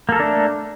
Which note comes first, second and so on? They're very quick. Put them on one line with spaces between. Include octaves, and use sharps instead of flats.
A#3 A4 A#4 D4 A3